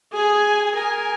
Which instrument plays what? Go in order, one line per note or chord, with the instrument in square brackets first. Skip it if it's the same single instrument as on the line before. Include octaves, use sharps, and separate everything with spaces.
[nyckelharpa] G#4 [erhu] G#5
[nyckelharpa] A#4 [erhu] G#5